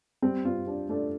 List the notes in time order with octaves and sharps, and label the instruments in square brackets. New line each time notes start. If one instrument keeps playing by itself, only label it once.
[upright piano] G3 C4
C4 F4
D4 G4
A3 D4